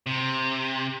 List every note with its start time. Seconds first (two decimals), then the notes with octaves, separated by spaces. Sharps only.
0.06 C3